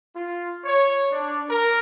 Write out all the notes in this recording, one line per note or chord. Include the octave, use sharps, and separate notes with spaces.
F4
C#5
D4
A#4